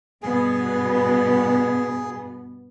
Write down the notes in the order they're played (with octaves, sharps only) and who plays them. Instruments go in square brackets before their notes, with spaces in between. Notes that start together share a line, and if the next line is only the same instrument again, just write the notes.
[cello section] G2 B2 B3 [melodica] G#4